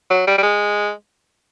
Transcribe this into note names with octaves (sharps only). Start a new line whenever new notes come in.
F#3
G3
G3
G#3